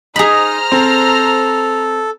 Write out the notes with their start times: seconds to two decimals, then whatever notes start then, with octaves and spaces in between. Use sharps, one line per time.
0.16 D#4 G#4 C5 D#5 A#5 B5 F6
0.72 C4 A4